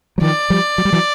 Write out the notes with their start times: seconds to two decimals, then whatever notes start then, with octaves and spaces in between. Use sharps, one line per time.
0.18 F#3
0.21 D#3 F3 D5
0.50 F3 G3
0.78 F#3
0.85 G3
0.93 E3 F#3